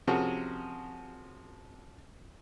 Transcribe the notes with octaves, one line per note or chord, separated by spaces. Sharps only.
C3 F3 C#4 F#4 G#4 A#4